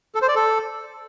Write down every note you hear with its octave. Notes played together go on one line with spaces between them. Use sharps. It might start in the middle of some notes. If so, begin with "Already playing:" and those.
A4
C5
D5
A4